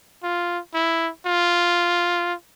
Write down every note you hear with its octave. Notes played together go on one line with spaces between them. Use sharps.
F4
E4
F4